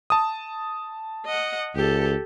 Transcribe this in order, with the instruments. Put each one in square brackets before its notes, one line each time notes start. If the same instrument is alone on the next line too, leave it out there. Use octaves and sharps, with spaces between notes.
[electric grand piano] A5 D#6
[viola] D#5 F#5
[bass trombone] C#2 [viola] G4 A4